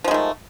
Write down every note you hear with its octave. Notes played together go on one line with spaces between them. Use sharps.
D#3 F3 G#3 A3